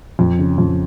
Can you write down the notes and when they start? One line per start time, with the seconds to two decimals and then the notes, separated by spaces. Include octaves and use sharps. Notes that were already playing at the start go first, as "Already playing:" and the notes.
0.19 F2
0.39 C#3
0.58 F2